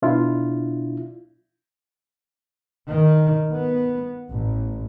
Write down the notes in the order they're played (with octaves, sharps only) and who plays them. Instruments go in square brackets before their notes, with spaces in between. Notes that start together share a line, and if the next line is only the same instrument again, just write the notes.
[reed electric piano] B2 D4 E4 F4
[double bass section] D#3
B3
A1